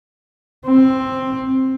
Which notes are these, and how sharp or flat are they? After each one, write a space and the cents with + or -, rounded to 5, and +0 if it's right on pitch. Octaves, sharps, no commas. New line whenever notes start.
C4 +10